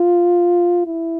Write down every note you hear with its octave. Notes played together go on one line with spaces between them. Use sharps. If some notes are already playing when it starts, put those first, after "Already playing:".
Already playing: F4
E4